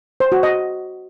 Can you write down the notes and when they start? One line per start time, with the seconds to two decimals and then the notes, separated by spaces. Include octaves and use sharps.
0.20 C5
0.32 F#4
0.43 D#5